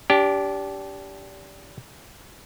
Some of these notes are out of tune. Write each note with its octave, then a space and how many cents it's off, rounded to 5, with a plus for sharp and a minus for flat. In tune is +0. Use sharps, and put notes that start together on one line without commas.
D4 -30 G4 +0